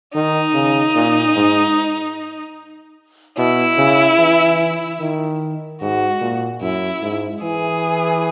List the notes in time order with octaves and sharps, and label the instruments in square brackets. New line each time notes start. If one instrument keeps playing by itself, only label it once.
[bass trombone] D#3 [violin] D#4
[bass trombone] C#3
A#2
G#2
[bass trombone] B2 [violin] E4
[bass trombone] C#3
E3
D#3
[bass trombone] G#2 [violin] F#4
[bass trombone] A#2
[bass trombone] F#2 [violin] E4
[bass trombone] G#2
[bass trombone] E3 [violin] G#4